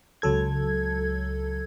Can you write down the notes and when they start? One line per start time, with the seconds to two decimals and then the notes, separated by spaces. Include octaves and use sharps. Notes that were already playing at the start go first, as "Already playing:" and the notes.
0.22 C#2 F#3 A4 G#6